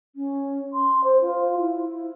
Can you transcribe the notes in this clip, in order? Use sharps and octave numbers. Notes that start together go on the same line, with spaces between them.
C#4
C6
C5
F4
E4